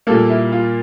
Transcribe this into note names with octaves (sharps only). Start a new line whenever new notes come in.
A#2 G3 A#3 A4
E4
F4